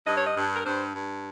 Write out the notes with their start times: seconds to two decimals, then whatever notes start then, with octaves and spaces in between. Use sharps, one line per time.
0.06 G2 D#5
0.17 C#5
0.26 D#5
0.36 G2
0.55 A#4
0.65 G2 C5
0.95 G2